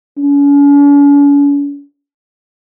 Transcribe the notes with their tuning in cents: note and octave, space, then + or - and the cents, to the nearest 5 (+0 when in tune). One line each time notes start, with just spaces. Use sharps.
C#4 +45